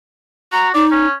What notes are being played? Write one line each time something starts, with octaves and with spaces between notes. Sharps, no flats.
F#4 A#5
D#4 D5
C#4